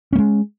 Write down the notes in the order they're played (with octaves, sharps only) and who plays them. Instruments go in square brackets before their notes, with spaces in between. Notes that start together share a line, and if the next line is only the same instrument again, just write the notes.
[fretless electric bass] C#4
A#3
G#3